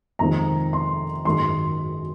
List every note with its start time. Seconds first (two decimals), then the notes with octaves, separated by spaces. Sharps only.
0.19 F2 C3 D#3 G#3 C4 A#5
0.73 C6
1.25 G#1 F#2 D#3 G#3 C6